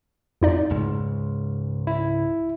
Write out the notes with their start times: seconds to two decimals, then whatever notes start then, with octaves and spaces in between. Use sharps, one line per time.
0.42 F2 D#4 D5
0.71 C#2 G#2
1.87 E4